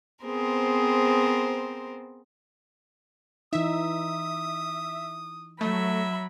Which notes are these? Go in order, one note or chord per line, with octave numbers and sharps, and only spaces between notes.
B3 C4 G#4 A#4 C5
E3 D#4 E5 D#6
F#3 A3 E5 B5